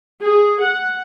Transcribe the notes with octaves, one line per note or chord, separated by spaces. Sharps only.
G#4
F#5